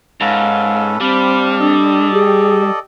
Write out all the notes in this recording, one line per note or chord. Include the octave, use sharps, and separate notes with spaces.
G#2 C#4 A4 B4 F5
G3 C4 D4 F5 B5
D4 A4 D5 D#5
G4 G#4